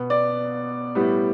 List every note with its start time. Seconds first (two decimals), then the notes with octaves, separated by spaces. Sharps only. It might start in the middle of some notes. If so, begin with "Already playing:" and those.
Already playing: B2 B3
0.10 D5
0.95 A2 G3 B3